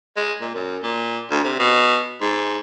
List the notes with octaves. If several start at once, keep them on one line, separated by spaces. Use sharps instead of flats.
G#3
A#2
F#2
A#2
D2
C3
B2
G#2